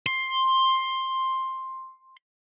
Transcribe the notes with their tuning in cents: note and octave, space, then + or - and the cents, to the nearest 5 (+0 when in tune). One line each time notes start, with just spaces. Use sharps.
C6 +10